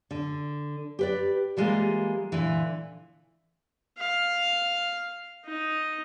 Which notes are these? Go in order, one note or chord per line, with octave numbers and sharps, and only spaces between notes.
D3
G4 B4 D5
E3 G3 G#3 A#3 F4
A#2 D3 E3
F5
D#4